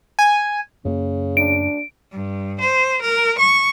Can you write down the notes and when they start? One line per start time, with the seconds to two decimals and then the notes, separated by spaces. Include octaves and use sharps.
0.19 G#5
0.85 F#2 C#3 A#3
1.37 D4 D7
2.11 G2
2.60 C5
3.01 A#4
3.37 C#6